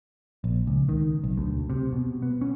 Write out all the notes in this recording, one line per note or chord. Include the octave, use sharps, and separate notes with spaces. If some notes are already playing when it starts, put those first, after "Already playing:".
A#1
C#2
D#3
B1
D2
C3
B2
B3
C#4